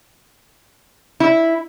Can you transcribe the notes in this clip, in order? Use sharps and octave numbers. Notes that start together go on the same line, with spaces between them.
E4